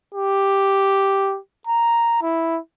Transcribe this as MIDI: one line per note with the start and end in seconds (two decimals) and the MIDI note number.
0.15 1.38 67
1.67 2.20 82
2.22 2.58 64